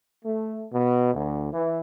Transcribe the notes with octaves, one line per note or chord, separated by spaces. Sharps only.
A3
B2
D2
E3